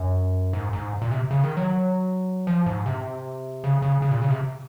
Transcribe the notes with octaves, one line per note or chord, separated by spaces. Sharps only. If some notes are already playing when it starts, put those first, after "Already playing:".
Already playing: F#2
G#2
G#2
A#2
C3
C#3
D#3
F#3
F3
G#2
C3
C#3
C#3
C#3
A#2
C#3
C3